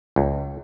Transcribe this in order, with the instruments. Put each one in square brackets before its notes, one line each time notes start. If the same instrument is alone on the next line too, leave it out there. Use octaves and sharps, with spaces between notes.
[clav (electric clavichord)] C#2